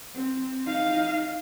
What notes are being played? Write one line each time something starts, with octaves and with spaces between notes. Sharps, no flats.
C4
D#4 F5